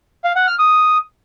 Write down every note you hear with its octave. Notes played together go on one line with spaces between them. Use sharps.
F5
F#5
F6
D#6